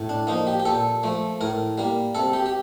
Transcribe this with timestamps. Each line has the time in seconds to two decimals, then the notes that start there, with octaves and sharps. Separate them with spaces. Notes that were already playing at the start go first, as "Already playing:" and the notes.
Already playing: A2
0.09 D4
0.27 F3 A#3 D#4
0.47 G4
0.60 G4
0.65 A#2 A4
1.03 F3 A3
1.41 A2 A#4
1.78 G3 A#3
2.15 C3 A4
2.33 G4
2.46 G4